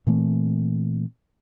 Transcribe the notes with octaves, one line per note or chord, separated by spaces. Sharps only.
A#2 E3 A3 C4